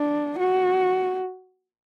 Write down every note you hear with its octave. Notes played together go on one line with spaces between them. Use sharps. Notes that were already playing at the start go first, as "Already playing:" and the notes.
Already playing: D4
F#4